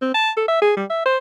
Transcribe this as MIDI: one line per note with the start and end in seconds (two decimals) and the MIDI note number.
0.02 0.14 60
0.14 0.31 81
0.37 0.44 69
0.48 0.60 76
0.62 0.72 68
0.77 0.85 55
0.90 1.03 76
1.06 1.18 72